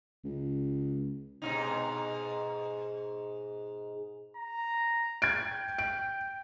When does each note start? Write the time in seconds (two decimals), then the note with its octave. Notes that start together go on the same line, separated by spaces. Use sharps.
0.24 C#2
1.42 G#2 B2 D#4
4.37 A#5
5.22 G5 G#6 D7
5.78 D7